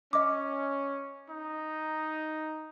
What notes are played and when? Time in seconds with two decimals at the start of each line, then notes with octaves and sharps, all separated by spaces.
0.13 C#4 D#5 D6
1.30 D#4